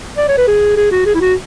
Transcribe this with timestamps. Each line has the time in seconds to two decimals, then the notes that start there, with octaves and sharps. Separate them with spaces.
0.18 D5
0.28 C#5
0.38 B4
0.48 G#4
0.77 G#4
0.92 F#4
1.06 G#4
1.15 E4
1.21 F#4